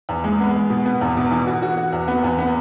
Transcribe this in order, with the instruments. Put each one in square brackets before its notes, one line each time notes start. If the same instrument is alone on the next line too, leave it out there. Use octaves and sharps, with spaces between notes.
[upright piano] E2
G#3
B3
G#3
B2
B3
E2
B2
E3
F#4
F#4
F#4
E2
B3
E2
B3